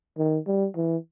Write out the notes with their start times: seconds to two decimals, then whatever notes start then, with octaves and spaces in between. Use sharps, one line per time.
0.18 D#3
0.47 G3
0.76 E3